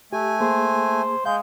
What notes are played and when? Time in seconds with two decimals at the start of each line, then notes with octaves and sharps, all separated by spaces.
0.13 A3 G4 G#5
0.41 A#3 G#4 C5
1.25 G#3 F5 G#5 G6